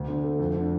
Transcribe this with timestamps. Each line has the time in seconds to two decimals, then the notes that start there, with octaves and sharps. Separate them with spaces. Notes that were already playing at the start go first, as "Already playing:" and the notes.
Already playing: D2
0.08 D3
0.24 A3
0.39 F2
0.56 D3